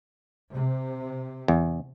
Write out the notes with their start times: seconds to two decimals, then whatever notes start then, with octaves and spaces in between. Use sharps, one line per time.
0.51 C3
1.48 E2